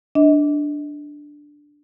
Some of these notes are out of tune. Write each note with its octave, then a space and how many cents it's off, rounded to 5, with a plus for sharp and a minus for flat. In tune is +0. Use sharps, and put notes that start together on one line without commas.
D4 +0 D#5 +30